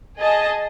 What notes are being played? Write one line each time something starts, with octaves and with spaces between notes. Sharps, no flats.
G#4 D#5 A5